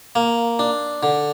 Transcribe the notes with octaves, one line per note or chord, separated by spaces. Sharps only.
A#3
D4
D3